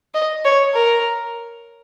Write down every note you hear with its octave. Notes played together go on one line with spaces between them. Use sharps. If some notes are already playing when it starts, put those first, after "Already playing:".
D#5
C#5
A#4